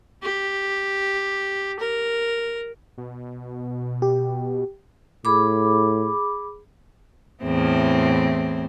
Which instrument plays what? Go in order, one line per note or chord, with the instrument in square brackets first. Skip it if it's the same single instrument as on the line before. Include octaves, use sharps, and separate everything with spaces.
[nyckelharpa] G4
A#4
[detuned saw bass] B2
[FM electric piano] G4
[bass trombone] A2 [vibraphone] G#4 B5 D6
[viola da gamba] E2 A2 C4